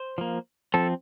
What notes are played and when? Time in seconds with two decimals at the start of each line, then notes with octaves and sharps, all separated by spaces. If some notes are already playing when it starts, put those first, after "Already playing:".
Already playing: C5
0.18 F3 A#3
0.74 F3 C4 A4